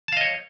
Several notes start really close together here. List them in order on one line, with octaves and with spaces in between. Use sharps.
A5 F5 D#5 C#5